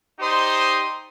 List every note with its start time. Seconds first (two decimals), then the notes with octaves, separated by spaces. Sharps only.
0.20 D#4 G4 C5 D5 C6 D#6